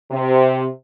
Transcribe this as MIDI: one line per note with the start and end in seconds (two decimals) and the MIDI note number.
0.11 0.66 48